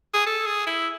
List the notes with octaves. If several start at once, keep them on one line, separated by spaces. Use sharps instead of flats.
G#4
A4
G#4
E4